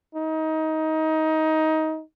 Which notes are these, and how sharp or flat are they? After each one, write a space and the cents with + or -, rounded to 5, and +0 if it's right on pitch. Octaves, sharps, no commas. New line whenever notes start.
D#4 +20